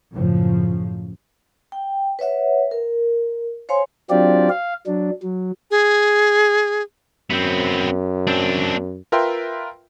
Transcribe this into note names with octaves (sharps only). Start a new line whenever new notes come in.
F#2 A2 C#3 F3
G5
B4 C#5 E5 F#5
A#4
C5 C#5 F5 G#5 C6
F#3 C4 D4 F4 G4 D5
F5
F#3 D4
F#3
G#4
F#2 B3 C4
C4 D4
F4 A#4 B4 E5 G5 C6